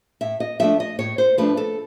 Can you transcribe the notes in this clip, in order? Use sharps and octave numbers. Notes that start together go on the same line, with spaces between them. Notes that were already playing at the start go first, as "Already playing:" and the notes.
A2 E5
D#5
F3 A3 D4 E5
D#5
A2 C#5
C5
F3 A3 D4 B4
A4